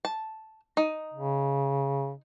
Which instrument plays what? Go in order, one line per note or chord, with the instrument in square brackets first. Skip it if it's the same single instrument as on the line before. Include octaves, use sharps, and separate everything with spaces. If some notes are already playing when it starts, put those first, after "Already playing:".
[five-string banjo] A5
D#4
[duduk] C#3